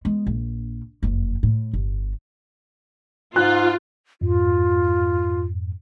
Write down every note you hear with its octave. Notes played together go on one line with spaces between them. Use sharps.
G#3 B3
A#1
F#1 F2
A2
G1
G#2 F4 F#6
F2 G#2 F4